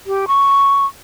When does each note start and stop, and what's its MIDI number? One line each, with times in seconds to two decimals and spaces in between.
0.06 0.25 67
0.28 0.86 85